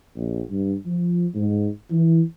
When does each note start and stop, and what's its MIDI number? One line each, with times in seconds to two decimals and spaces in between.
0.16 0.43 34
0.50 0.75 43
0.86 1.26 53
1.35 1.69 44
1.91 2.22 52